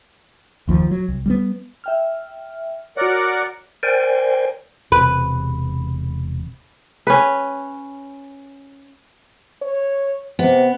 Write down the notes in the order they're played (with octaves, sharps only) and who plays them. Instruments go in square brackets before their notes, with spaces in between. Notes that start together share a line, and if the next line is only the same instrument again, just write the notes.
[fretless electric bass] F#1 D#2 F3
F#3
C2
G3 G#3 B3
[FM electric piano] E5 G5 F6
[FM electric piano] F#4 C#5 [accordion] A#4 D5 F#5
[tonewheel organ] A#4 C5 D5 G5 G#5
[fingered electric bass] E1 C3 [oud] B4
[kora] C#4 B4
[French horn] C#5
[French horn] C3 [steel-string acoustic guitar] B3